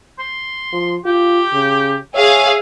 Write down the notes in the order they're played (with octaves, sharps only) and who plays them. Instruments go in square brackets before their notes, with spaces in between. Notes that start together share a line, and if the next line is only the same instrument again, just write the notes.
[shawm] C6
[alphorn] F3
[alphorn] F4 [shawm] G4
[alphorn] C#3
[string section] G#4 F5 [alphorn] C#5 [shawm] E5